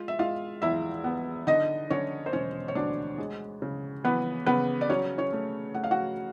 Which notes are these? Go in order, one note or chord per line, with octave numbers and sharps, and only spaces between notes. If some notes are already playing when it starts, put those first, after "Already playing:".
Already playing: G#3 F4
E5
G#3 F4 F5
E2 E4 E5
B3
D3 D#4 D#5
D3 C#4 C#5
C5
E1 C#4 C#5
C#5
D2 D4 D5
G#3
C#3
E3 B3 B4
C#3 B3 B4
D5
F#3 C#4 C#5
C#4 C#5
A3
A3 F#5
F5
F#4 F#5